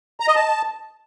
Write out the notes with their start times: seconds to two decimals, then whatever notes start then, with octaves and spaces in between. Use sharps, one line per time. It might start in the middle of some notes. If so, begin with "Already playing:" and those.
0.20 A#5
0.28 D#5
0.36 A5